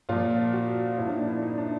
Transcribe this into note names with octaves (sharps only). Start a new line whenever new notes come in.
A#2 F3 F4
F#4
A#2 F3 E4
D4
D#4
E4
D#4
D4